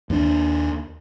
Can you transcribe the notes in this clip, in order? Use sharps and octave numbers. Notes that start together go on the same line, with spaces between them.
D#2 D4